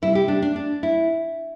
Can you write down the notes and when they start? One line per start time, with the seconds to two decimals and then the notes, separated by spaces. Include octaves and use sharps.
0.02 C3 G3 E4
0.15 G4
0.28 D4
0.42 D4
0.56 D4
0.83 E4